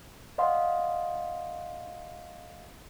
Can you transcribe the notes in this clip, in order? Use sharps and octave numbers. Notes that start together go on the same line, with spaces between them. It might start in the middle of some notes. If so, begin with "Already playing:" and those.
D5 D#5 F5 F#5 C6